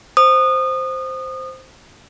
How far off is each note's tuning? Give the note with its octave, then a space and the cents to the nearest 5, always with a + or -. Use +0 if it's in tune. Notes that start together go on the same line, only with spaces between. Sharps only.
C5 +0 D#6 -25